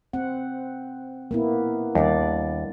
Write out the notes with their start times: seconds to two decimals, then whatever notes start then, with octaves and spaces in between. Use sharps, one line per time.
0.13 C4 F#5
1.31 A#3 B3 E4
1.95 D#2 G3 D4 D5